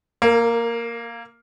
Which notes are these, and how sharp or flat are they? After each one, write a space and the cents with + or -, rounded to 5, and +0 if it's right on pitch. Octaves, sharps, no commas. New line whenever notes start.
A#3 +0 A#4 -40